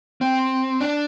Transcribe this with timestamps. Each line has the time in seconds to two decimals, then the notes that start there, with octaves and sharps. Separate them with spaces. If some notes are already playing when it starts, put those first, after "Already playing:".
0.21 C4
0.81 D4